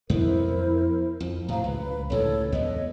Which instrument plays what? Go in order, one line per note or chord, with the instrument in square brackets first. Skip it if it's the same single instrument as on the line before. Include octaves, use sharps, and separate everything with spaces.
[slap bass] F2 B3 [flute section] E4 A#4 C5
[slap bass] F2
[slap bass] A2 F#3 [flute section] C5 F5 A#5
[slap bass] C#2 [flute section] B4
[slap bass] C#2 A2 D3 [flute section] A4 C#5
[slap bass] E2 B3 [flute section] C#5 D#5